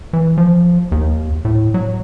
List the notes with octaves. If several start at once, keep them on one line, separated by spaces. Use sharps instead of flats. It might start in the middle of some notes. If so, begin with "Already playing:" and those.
E3
F3
D#2
A2
F#3